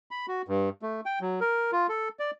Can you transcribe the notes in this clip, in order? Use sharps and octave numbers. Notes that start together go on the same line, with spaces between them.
B5
F#4
G2
A3
G5
F#3
A#4
F4
A4
D5